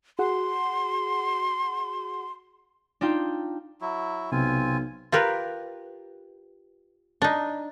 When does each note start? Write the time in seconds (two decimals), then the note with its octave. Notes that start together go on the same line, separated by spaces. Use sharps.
0.19 F#4 G#4 F#5 C6
3.01 D4 D#4 F4 G5
3.81 F#3 E4
4.32 B1 C3 C4 F4 G#5
5.12 F4 G4 A#4 B4
7.22 D4 D#4